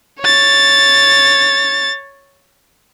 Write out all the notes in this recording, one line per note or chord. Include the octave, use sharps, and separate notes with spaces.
C#5 A6